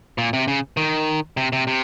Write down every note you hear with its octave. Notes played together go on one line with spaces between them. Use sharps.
A#2
C3
C#3
D#3
C3
C3
C3